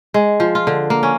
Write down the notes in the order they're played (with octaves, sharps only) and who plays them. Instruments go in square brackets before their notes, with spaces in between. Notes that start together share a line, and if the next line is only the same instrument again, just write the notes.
[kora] G#3
F3
F4
D3
A#3
C#4